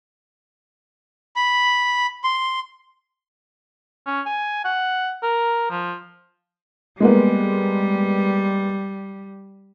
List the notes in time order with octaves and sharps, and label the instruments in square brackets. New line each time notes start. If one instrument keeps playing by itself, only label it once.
[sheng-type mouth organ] B5
C6
[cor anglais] C#4
G#5
F#5
A#4
F3
[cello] G3 [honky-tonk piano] G#3 A#3 B3